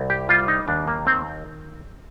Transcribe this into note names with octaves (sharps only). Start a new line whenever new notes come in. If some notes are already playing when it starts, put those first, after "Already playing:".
Already playing: C2
G4
G3 F4
D#4
D#2 D4
A#3
D#3 C4